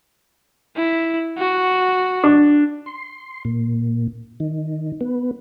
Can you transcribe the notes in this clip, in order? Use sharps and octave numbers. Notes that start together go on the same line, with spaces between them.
E4
F#4
D4
C6
A#2
D#3
B3